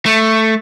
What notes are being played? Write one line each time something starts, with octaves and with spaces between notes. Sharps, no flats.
A3